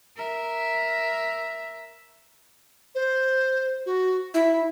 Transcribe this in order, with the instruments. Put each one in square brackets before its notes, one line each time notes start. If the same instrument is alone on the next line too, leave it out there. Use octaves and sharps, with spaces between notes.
[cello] A#4 E5
[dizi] C5
F#4
[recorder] E4 [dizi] E5